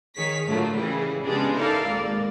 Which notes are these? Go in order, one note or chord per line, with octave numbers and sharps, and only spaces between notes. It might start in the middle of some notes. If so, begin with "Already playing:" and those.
D#3 G#4 C#5 B6
A2 D3 F#3 A3 A#3 F4
C#3 E3 G3 G#4
C#3 G3 G#3 B3 D4
D#4 E4 A4 A#4 D5 F5
G#1 A#3 D5